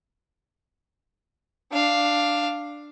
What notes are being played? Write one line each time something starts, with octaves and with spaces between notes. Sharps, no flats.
D4 F5